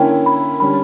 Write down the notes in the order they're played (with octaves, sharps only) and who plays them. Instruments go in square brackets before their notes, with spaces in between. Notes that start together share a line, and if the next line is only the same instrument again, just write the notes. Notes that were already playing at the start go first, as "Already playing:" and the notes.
Already playing: [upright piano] D3 A#3 C#4 E4 [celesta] G5
[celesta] B5
[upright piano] D3 G3 C#4 [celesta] B5